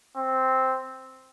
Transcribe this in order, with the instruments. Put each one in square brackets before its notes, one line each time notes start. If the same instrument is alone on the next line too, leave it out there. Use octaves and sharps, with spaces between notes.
[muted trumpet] C4